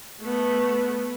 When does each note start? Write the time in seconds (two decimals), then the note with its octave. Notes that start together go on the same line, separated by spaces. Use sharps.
0.21 A3 B3